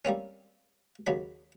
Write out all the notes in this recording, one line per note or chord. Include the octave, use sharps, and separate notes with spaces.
G3 A#3 C4 C#4
D#2 C#3 F#3 B5